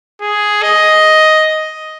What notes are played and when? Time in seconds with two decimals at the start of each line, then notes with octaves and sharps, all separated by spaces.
0.21 G#4
0.63 D#5